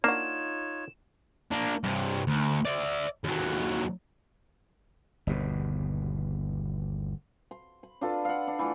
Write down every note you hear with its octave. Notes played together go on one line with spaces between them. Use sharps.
A#3 D4 D#4 F4 F#4 C#5 E7
A#3 D4
G2 C3
D2
D5 E5
D#2 F#3
G1 D#2 B2
C6
B5
D4 F4 A4 B4
F5 F#5
D4
E3 A3 F4